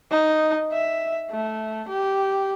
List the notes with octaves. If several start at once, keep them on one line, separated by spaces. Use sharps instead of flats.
D#4
E5
A3
G4